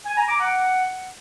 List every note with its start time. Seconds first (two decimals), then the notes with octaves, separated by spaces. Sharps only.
0.06 G#5
0.17 A#5
0.29 D6
0.40 F#5